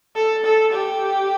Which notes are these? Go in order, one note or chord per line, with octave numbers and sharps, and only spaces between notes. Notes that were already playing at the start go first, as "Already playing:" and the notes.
A4
A4
G4